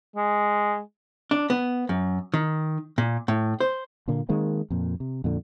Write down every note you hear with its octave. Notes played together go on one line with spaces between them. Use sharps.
G#3
D4
B3
F#2
D#3
A#2
A2
C5
A#2 D3 A#3
D#3 G#3 A#3 C4
F2 A#2
C3
F2 A#2 D3